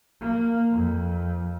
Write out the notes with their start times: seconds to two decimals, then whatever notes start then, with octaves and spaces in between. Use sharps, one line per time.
0.21 A#3
0.72 F2